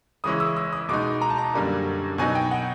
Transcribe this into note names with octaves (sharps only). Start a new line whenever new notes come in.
C#3 E3 G#3 C#4 E4 D#6
E6
E6
D#6
B2 G#3 B3 D#4 D6
A#5
A5
A#5
F#2 D3 G3 A#3
B2 F#3 B3 D#4 G#5
G5
F#5